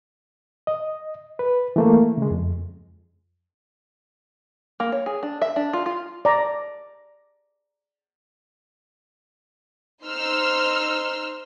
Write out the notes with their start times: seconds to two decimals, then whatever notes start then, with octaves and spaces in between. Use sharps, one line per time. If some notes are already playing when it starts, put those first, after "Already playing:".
0.67 D#5
1.39 B4
1.76 E3 A3 A#3
2.18 C#3 G#3
2.31 F2
4.80 A#3
4.92 C#5
5.06 G#4
5.23 D4
5.42 E5
5.56 D4
5.73 F4
5.86 F4
6.25 D5 A#5
10.03 D#4 C5 C6 E6 F6